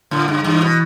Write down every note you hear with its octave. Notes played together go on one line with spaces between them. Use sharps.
A2 D3
G2
G2 E3
B2